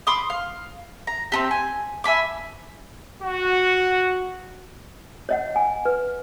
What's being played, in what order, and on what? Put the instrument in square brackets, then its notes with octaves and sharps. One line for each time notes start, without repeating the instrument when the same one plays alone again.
[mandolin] B5 C6 D6 D#6
F5
A#5
C4 D#4 G4
G#5
E5 G#5 B5 D6
[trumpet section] F#4
[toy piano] C#5 D#5 F#5
G#5
B4